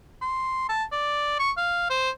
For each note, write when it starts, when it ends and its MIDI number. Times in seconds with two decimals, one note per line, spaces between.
0.22 0.65 84
0.69 0.84 81
0.92 1.38 74
1.39 1.52 85
1.57 1.86 77
1.90 2.10 72